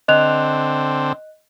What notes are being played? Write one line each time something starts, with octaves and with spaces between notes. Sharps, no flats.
D3 C4 D#5 F#6 F7